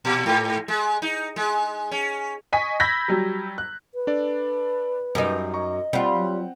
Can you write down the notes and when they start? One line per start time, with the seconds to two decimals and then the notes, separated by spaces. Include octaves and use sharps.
0.05 A#2
0.26 G#2
0.68 G#3
1.02 D#4
1.36 G#3
1.91 C#4
2.52 D#5 G#5 C#6 B6
2.80 B5 E6 G6 G#6 A#6 B6
3.08 F#3 G3
3.58 F#6
3.95 B4
4.07 D4 A4 D5
5.15 F#2 G3 D#4
5.54 D#5 A#5 C#6
5.93 G3 C4 F4 F#5 G5
6.14 F#3